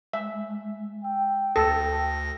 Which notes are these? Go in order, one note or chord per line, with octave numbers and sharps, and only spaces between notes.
G#3 E5
G5 E6
D2 A4 A#6